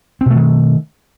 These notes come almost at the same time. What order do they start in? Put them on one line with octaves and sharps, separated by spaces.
C4 B2 A3 D#3